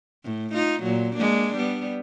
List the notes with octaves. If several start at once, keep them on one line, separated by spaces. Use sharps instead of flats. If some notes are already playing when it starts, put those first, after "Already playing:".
A2
D#4 F4
A#2 F#3
G#3 A#3 D4
G3 B3